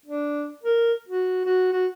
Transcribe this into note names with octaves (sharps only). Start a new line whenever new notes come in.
D4
A#4
F#4
F#4
F#4